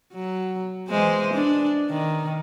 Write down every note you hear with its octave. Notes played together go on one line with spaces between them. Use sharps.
F#3
E3 G#3 C5
D4
D#3